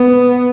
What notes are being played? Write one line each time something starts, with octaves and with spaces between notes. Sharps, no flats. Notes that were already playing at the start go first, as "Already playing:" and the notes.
Already playing: B3